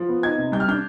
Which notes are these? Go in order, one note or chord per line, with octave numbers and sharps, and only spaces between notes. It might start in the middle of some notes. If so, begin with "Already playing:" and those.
Already playing: F3
B3
D#4 G#6
C3
G3 G6
F6
D4 G6